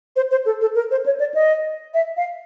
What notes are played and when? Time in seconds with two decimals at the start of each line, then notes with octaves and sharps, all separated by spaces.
0.16 C5
0.31 C5
0.46 A4
0.61 A4
0.75 A#4
0.91 C5
1.06 C#5
1.20 D5
1.34 D#5
1.94 E5
2.17 F5